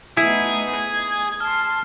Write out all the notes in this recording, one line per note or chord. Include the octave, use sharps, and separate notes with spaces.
A3 B3 D#4 E4 G#4
G#6
A5 C6 F6